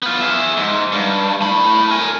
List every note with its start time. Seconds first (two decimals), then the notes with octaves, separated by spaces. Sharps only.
0.03 B3 F4
0.21 G#4 E5
0.57 G#2
0.92 G2
1.41 A2 B5
1.91 A#4 G#5